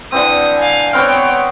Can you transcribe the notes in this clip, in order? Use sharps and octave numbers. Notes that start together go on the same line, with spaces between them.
D3 E3 C4 D#6
F5 G#5
B3 C4 C#5 F5 G5